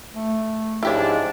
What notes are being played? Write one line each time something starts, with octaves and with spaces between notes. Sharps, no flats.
A3
G#2 F3 D4 E4 G4 C#5